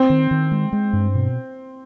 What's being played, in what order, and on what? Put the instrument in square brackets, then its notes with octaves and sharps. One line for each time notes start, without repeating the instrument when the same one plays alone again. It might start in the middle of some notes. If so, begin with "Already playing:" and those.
Already playing: [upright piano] C4
[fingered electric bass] D#3
D#3
G#3
G#3
G2
B2